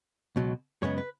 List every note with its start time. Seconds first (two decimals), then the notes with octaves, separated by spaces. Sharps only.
0.36 C#2 B2 F#3
0.82 F#2 C#3 G#3 B3 C#5
0.98 B4